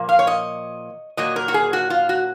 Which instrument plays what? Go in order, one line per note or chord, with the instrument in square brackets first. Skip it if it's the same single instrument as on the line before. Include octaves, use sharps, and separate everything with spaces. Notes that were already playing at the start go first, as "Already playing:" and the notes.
Already playing: [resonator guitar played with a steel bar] A#2 F3 A#3
F5
C#5
D#5
A#2 F#3 A#3 D#5
A#4
F#4
G#4
F#4
F4
F#4